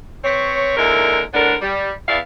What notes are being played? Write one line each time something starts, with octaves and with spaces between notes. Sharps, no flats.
C4 B4 C#5
D#2 D3 G#3 E4 A#4
A2 D3 B3 D4 A#4
G3
E2 B3 E4 D5 F5